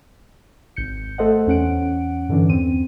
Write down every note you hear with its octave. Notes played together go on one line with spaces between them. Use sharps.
G#1 G6 C#7
A3 A4 C5 D#5 F#5
E2 C#4 F#5 D7
G2 D3 E3 C#4 D4
E2 C4 D#7